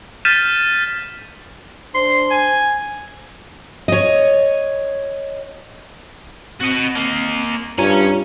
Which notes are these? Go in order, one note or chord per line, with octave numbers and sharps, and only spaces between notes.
F6 G6 A6 B6 D#7 E7
D4 C5 C6
G#5
C#5 D#5
C4 F#4 D#5
A#3 D#5
G2 C#4 F4 C#5 G#5 A#5